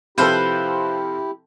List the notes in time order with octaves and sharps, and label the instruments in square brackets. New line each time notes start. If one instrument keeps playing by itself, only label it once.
[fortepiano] C3 F3 A4 [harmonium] E4 G4 [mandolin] B4 C5 F5